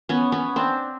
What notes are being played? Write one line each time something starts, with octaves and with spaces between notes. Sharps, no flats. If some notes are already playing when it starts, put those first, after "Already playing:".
B3 C#4
B3 C#4
C4 D4